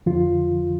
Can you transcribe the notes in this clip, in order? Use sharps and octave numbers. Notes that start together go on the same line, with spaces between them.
F2 D3 F3 F4